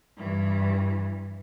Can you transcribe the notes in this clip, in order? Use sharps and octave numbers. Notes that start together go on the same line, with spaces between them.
G2 E3